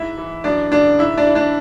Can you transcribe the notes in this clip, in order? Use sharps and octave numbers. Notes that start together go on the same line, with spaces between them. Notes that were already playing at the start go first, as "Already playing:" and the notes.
Already playing: G#2 E4 E5
E3
F#2 D4 D5
C#3 D4 D5
G#2 E4 E5
D4 D5
E3
D4 D5